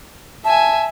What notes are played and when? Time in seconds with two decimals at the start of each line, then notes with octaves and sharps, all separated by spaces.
0.45 E5 G#5 A5